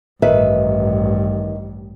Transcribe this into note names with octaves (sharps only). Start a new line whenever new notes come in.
A1 G2 D#3 B4 E5